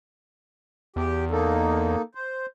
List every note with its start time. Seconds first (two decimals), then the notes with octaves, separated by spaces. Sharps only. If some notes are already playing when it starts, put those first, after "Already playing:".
0.96 E2 G4
1.31 A#3 D#4 A4
2.15 C5